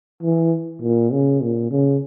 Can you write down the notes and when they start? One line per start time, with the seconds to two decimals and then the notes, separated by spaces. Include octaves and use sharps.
0.23 E3
0.82 A#2
1.12 C#3
1.42 A#2
1.71 C#3